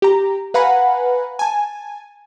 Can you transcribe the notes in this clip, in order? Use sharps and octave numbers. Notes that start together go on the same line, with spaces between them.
G4 A#5
B4 F5 F#5 G#5 A#5 B5
G#5 A5